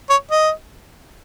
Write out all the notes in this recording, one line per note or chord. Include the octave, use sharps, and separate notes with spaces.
C#5
D#5